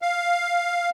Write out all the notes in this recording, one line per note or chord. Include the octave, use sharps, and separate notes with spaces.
F5